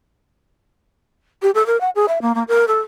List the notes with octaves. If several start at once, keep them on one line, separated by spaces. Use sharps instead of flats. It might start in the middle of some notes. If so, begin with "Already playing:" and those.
G4
A4
A#4
F#5
G#4
E5
A#3
A#3
A#4
A4